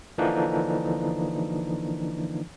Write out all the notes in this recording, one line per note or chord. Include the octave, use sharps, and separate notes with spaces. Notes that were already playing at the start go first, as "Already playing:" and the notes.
D3 E3 F3 A#3 D4 D#4